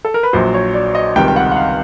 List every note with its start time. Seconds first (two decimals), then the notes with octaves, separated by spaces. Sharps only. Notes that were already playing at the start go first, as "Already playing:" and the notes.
0.05 A4
0.14 A#4
0.23 B4
0.33 A#1 A#2 F#3 C5
0.54 C#5
0.74 D5
0.95 D#5
1.16 C#2 C3 D#3 G3 G5
1.28 G5
1.36 F#5
1.52 F#5
1.57 F5